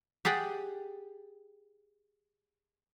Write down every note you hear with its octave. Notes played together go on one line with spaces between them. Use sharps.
G4 G#4 D5 F#5 G5